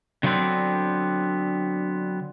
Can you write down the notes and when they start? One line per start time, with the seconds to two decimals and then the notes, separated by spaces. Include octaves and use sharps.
0.23 D3 F#3 A3 B3 C4 D4